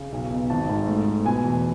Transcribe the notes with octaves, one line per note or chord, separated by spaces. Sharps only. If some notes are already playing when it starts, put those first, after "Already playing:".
Already playing: C#3
B1
B2
G#1 A5
G#2
A3
A3
B2 G#5
E2